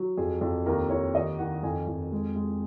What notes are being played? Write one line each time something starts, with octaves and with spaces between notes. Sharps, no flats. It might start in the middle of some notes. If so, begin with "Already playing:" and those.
Already playing: F#3
F2 G#4
F2
D#2 A#4
D#2 C#5
D#3 D#5
D#3 F#5
F2 G#5
F2
G#3
G#3